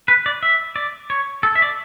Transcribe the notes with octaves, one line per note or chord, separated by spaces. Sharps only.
B4
D5
E5
D5
C#5
A4
E5
D5